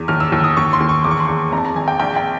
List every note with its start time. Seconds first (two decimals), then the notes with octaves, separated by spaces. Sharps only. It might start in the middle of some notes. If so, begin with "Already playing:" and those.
Already playing: E2
0.08 D#2 F6
0.20 E6
0.32 D#2
0.44 D#6
0.57 D#2 C#6
0.73 C6
0.80 D#2
0.89 C#6
1.04 E2 D6
1.11 C#6
1.20 C6
1.27 E2 C#6
1.52 G#1 A#5
1.58 A5
1.65 A#5
1.75 G#1 G#5
1.88 G5
2.00 A#1 G5
2.16 G5